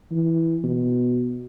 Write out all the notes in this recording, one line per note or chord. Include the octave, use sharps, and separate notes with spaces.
E3
B2